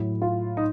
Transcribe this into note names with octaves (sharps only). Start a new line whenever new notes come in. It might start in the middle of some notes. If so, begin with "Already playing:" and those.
Already playing: A2 F#3 E4
F4
D#4